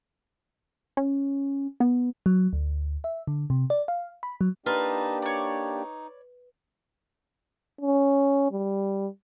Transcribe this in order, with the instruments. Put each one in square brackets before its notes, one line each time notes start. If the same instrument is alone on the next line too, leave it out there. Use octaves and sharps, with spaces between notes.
[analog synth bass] C#4
B3
[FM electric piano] F#3
D2
E5
D3
C3
D5
F5
B5
F#3
[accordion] A#3 D4 G4 [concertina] D#4 D#5 A5 [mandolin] F4 [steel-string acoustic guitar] B4
[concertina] D#4 [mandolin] C#5 D5
[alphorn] C#4
G3